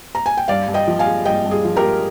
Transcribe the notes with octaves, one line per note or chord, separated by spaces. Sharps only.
A#5
G#5
G5
G2 D5 F5
G2
D#5 G5
F3
F5 G#5
G#3
G2 D#5 G5
G2
G#4
F3
G4 A#4
G#3